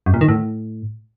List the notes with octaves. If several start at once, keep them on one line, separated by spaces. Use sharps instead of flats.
F#2
A#2
D#3
A2